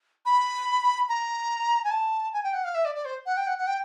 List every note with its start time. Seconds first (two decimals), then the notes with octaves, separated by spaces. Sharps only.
0.26 B5
1.09 A#5
1.84 G#5
1.91 A5
2.33 G#5
2.44 G5
2.53 F#5
2.64 F5
2.75 E5
2.85 D5
2.95 D5
3.05 C5
3.26 F#5
3.37 G5
3.47 F#5
3.58 F#5
3.67 G5